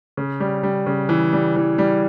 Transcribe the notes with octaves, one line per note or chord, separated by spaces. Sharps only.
C#3
G3
G3
C#3
E3
G3
E3
G3